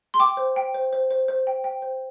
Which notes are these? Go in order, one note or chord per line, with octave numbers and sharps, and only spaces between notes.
C6
G5 D6
C5
G5
C5
C5
C5
C5
G5
G5
C5